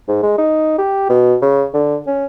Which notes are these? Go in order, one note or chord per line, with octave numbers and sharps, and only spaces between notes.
G#2
G#3
D#4
G4
B2
C#3
D3
C#4